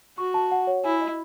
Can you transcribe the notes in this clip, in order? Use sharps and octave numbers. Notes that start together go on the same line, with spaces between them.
F#4 C#6
A5
F#5
C#5
E4 G#5
D#5